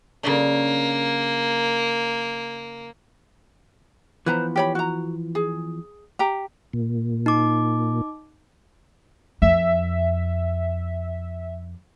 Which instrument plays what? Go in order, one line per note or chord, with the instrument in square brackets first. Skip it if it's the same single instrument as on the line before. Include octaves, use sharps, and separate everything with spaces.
[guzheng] C#3 F#3 D4 [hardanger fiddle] A#3
[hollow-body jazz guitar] E3 F3 B3 [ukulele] B4 C5 A#5
[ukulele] G4 C#5 B5
F#4 A#5
G#4
G4 A#5
[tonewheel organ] A#2
[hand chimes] D#4 D6
[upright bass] F2 [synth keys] E5